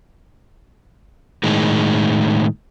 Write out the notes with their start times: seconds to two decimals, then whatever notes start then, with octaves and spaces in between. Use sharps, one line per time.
1.43 A2 D#3 G#3